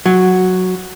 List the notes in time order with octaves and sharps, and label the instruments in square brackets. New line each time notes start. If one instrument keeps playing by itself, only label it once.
[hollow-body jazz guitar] F#3